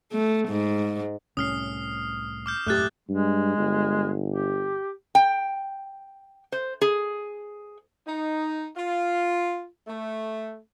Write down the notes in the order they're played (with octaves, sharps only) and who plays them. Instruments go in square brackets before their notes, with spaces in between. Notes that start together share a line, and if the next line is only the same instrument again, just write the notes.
[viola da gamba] A3
G#2
[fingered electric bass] C2 A2 [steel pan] C#4 [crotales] D#6 F6 C7
[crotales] D6 F6 G6
[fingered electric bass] E1 F#2 A2 [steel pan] A3 G4 [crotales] D6 F#6 A6
[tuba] G2 [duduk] G#3
[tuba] G1
[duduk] G4
[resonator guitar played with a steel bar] G5
C5
G#4
[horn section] D#4
F4
A3